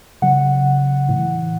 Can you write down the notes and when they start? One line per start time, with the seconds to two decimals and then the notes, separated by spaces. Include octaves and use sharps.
0.22 C#3 F#3 F#5
1.09 A2 E3